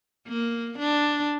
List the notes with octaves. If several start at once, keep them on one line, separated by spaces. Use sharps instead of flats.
A#3
D4